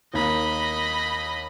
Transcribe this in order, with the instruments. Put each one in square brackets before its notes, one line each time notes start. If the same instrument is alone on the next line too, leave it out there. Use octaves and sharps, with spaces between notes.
[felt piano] D#2 A#3 [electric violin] D#5 B5